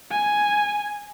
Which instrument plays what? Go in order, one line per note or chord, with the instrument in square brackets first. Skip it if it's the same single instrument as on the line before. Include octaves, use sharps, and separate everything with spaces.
[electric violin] G#5